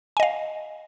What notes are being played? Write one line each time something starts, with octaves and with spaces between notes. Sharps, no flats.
D#5 F5 G#5